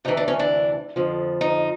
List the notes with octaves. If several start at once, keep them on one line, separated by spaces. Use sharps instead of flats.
D2 C3 E3 D#4
D4
C#4
D4
F2 D3 F3
D#4